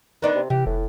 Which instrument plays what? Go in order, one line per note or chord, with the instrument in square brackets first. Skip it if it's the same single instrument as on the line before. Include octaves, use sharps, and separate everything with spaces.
[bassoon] D#3 [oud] B3 D4 D#4
[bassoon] C3
[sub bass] C3 [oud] E3 [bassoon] G4
[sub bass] F1 [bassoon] A2